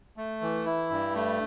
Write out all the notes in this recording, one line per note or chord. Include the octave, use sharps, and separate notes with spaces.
A3
E3
E4
G2
A3